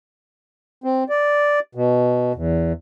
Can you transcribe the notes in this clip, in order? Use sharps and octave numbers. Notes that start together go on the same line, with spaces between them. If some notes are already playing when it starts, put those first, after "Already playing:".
C4
D5
B2
E2